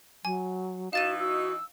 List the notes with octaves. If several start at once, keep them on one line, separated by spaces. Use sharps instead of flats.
F#3 G#5
E3 D#4 F#4 F5 A6 D#7 E7
F#4 E6